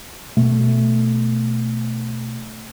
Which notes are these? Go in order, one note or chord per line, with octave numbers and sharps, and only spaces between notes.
B2 A3